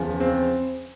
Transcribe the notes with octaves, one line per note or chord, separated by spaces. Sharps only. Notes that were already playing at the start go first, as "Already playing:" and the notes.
Already playing: E2 C#3 F3
C4